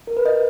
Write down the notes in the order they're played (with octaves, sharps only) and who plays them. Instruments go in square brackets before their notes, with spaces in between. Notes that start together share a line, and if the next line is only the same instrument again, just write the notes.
[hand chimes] A#4
B4
D#5